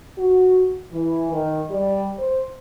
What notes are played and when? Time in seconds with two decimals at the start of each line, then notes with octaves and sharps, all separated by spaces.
0.17 F#4
0.92 E3
1.32 D#3
1.70 G3
2.17 C5